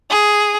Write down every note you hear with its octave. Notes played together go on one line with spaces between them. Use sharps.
G#4